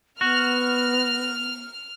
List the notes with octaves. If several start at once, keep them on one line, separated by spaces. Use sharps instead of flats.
B3 F#4 F6